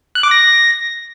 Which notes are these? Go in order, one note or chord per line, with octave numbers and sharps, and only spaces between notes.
F#6
D6
A#6